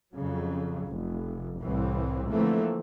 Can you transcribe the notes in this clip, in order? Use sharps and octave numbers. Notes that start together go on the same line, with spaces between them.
F2 C#3 F#3
F1
C2 A2 E3 C4
D3 E3 F3 A3 A#3 C4